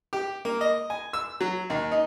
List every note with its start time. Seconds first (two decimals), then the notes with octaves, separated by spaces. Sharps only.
0.13 G4
0.45 A#3
0.61 D#5
0.90 G#5
1.13 E6
1.41 F#3
1.70 D#2
1.91 D#4